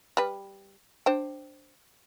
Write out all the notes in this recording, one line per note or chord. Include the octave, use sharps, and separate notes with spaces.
G3 B4
D4 C5 G5